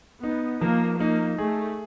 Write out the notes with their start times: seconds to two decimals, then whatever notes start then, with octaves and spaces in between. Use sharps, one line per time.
0.23 B3 D#4
0.61 F3 A#3
1.00 A#3 D#4
1.38 A3 G#4